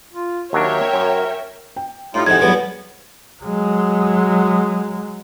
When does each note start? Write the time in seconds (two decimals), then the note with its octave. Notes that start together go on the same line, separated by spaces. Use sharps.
0.13 F4
0.53 D#2 F#3 D4 A#4 C#5 E5 G5
0.94 F#2
1.76 G5
2.14 A2 G3 D#4 F4
2.27 F2 C3 E3 D#4 G#4 A4 F#5 G#6
2.41 E2 F#3 G3 B3 G#4 B4 G#5
3.43 F#3 G#3